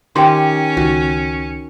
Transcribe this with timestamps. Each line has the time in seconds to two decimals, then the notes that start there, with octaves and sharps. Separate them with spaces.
0.16 D#3 C#4 G4 G5 C6
0.77 C#2 D#3 F#4